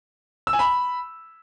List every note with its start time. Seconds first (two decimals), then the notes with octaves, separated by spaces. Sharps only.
0.47 E6
0.53 G#5
0.59 B5